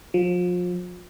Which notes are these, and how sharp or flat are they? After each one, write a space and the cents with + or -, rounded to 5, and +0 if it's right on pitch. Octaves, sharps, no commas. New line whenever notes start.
F3 +35